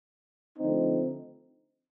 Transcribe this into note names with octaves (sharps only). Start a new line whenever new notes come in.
D3 F3 A3 C4 D#4